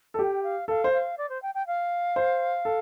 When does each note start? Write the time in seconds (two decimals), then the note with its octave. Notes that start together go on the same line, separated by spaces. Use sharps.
0.14 A4
0.19 G4 G5
0.43 F5
0.68 A4 F5
0.84 C5
0.93 F5
1.18 D5
1.29 C5
1.42 G5
1.54 G5
1.67 F5
2.16 C5
2.65 A4